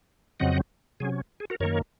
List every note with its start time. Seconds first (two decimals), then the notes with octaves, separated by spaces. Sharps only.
0.40 F2 C#3 F#3 C4 D#5 F#5
1.00 C3 F#3 C#4 G#4
1.40 G#4
1.50 F#4 A#4
1.60 F#2 D#3 A#3 A#4 C#5